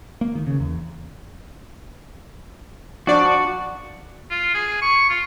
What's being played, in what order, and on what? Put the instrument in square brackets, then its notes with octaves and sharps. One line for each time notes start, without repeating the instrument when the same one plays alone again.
[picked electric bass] A#3
D#3
C#3
E2
[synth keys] F3 D4 D5 [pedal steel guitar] F#4
[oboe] F4
G#4
C#6
F4